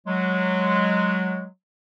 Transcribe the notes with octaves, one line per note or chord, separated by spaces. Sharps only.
F#3 G#3